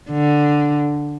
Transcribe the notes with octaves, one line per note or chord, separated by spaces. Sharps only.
D3